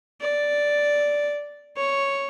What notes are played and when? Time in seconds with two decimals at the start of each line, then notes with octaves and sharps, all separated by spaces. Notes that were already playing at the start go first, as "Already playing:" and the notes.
0.21 D5
1.77 C#5